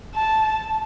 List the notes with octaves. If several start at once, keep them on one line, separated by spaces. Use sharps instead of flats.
A5